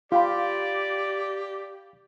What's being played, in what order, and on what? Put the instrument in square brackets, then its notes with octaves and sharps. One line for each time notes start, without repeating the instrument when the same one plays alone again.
[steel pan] F4 [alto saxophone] G4 [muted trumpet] D5 [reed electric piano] F5 G5 B5